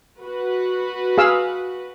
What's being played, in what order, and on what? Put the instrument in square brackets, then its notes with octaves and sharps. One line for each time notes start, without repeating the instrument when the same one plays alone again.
[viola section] F#4 B4
[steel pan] G#4 F5 E6